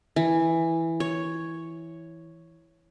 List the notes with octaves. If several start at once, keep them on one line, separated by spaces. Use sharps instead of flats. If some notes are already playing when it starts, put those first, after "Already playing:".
E3
C#5